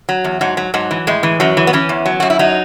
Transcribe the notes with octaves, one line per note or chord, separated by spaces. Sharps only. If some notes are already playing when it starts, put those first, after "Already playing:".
F#3
E2
G#2 F#3
F#3
G#2 F#3
E3
A2 G#3
E3
F#2 F#3
E3
B3
E3 C#4
E2
F#3
F#2 F#4
E4
F#3 D#4